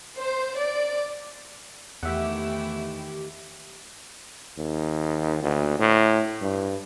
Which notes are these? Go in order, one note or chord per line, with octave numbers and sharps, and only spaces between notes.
C5
D5
E2 D#3 E3 A3 E4 G4 E5 F#5
D#2
D2
A2
G2